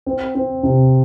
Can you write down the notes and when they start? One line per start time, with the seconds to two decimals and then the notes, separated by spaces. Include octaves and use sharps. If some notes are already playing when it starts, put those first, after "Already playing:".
0.06 C4
0.35 C4
0.63 C3